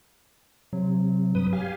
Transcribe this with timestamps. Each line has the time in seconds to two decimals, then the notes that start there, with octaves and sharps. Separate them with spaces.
0.73 C3 F#3
1.35 G2 B4 D#6
1.53 G4 F5 G#5